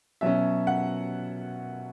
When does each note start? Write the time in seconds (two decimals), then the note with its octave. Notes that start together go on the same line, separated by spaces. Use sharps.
0.21 B2 F#3 C#4 E5
0.67 F#5